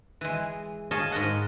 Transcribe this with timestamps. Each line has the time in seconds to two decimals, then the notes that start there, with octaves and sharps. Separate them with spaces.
0.21 E3 G#3
0.91 G#4 C#5 D#5 F5 A5
1.12 G#2 A#4 D#5 F#5